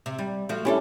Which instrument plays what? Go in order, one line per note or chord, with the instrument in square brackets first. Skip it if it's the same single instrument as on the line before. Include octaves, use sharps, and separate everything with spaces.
[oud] C3
G3
F3 A3 F#4
[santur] G3 C#4 D4 [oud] E4 F4 A4